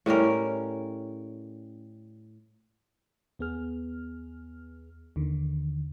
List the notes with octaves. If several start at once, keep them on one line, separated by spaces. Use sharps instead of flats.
A2 G3 C#4 A#4
D#2 B3 G#4 F6
D#2 D3 D#3